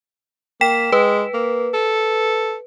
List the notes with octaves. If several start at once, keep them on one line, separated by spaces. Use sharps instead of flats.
A#3 G5 B6 E7
G#3 B4
A#3
A4